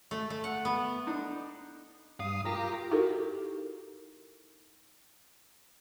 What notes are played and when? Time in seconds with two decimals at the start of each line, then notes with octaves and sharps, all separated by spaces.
0.11 A3
0.30 A3
0.44 F#5
0.65 B3
1.07 D4 D#4
2.20 G2 F5 D#6
2.45 F4 G4 A#4 G5 A#5
2.91 D#4 E4 F#4 G4 A4 A#4